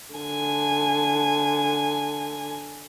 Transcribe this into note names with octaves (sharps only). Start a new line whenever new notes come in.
D3 G#5